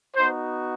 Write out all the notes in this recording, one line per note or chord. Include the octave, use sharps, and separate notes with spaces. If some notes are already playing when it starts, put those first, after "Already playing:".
B3 D#4 F#4 C5